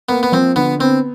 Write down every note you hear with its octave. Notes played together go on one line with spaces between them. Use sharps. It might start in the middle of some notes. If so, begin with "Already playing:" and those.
A#3 B3
B3
F3 C4
D3 B3
B3 C4